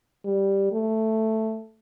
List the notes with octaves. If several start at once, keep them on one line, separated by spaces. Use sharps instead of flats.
G3
A3